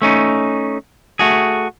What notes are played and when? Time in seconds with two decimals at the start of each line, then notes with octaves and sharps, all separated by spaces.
0.02 A3 C#4 D#4
1.19 A3 F#4 G#4